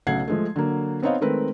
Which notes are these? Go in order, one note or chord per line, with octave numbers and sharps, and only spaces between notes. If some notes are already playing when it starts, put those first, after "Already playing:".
B1 C#3 A3 F#5 G#6 C7
F3 G#3 A3
D3 F#3 A#3
B3 C4 D#4 C#5 D#5 F5
D#3 G#3 A3 C4 A#4 B4